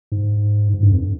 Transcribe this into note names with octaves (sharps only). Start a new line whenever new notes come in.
G#2
G#2
G2
F2